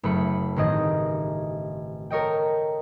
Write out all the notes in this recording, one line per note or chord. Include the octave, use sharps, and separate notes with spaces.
F#1 A3 B5 C#7
A1 G2 D#3 C4 G#4 D#5
A4 A#4 C#5 D#5 G5